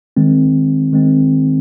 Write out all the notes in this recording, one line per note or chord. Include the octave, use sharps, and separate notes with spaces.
D#3 G#3 C4
D#3 G#3 C4